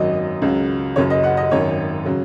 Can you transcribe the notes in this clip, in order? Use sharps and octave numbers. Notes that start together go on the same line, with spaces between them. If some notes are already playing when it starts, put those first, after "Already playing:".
Already playing: G#1 F#2 F#3 D#5
C#2 C#3 F#3
F#1 F#2 C#3 F#3 C#5
D#5
F#5
D#5
G#1 F#2 D#3 C#5
C#3 F#3